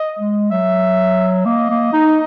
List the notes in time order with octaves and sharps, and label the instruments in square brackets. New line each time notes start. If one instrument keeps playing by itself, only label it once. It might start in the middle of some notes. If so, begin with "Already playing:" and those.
Already playing: [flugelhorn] D#5
[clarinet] G#3
[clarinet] F#3 [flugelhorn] E5
[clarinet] A#3 [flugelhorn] D#5
[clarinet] A#3
D#4